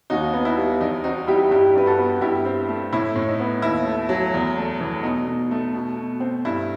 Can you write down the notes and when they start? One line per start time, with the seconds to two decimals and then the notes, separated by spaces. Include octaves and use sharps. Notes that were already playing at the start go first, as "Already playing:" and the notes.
0.10 D#2 D#4 F#4
0.34 B3
0.45 E4
0.57 G3
0.81 E2 D#4
1.04 C4 D#4 F#4
1.28 G3 E4 G4
1.51 G2 E4 G4
1.75 G2 B4
1.86 F#4 A4
1.99 B3
2.21 G2 E4 G4
2.45 C4
2.69 A3
2.93 A2 E4
3.16 A2
3.27 D#4
3.40 B3
3.62 D#2 E4
3.86 A3
4.09 F#3
4.34 E2
4.57 A3
4.80 E3
5.03 B2 D#4
5.27 B2
5.51 A3
5.74 B2
5.97 B2
6.20 C4
6.45 G2 E4